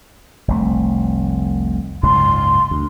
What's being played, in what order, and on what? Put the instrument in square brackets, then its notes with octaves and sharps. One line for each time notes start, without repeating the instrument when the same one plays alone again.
[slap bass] F1 C2 A3
[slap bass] F#1 C#2 G#2 [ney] C6
[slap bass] D2